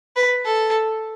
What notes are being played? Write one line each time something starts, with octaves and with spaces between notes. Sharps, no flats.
B4
A4